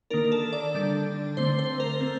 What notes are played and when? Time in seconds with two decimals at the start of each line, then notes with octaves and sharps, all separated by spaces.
0.10 D#3 A#3 D4 A#4
0.32 A4
0.53 D5
0.75 D3 G3 D4
1.37 D3 A3 C4 C5
1.59 C5
1.80 A#4
2.01 A3 C4